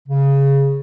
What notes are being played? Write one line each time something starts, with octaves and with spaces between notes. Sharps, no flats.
C#3